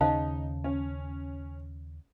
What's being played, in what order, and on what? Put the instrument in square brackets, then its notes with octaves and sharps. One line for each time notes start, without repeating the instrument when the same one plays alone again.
[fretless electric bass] D#2 C#3 [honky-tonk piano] D#4 [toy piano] C5 F5 A5
[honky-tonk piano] C#4